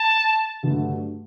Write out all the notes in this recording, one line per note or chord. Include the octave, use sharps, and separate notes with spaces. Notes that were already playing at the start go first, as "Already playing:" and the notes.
Already playing: A5
G2 D3 F#3 A3